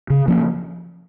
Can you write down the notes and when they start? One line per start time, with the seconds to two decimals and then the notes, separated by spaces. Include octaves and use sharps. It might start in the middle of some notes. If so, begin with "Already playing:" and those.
0.10 C#3
0.28 F3 A#3 C#4